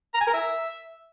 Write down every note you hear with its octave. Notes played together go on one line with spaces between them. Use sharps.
A#5
G#5
A#4
E5